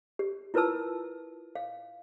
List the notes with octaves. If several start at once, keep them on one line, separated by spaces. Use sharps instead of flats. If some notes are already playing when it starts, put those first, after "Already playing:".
G4
E4 F4 A#4 B4 A5 E6
F5